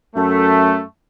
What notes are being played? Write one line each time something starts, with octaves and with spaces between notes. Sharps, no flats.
F#2 A3